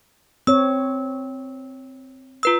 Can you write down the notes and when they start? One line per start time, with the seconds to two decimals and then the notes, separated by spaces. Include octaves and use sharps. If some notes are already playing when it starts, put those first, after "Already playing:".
0.47 C4 C#5 E6
2.43 F4 B4 E6